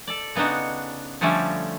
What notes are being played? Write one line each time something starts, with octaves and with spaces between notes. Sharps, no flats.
A4 D5
C#3 B3 D4 D#4 F#4
D3 F3 G3 A3 C#4 G4